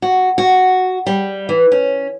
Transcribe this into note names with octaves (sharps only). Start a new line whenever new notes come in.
F#4
F#4
G3
E3
C#4